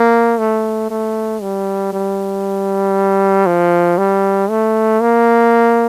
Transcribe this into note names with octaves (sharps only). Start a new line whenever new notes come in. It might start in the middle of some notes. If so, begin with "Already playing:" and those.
Already playing: A#3
A3
A3
G3
G3
F3
G3
A3
A#3